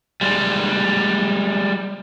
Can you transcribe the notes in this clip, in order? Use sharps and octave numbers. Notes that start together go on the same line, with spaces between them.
G3 G#3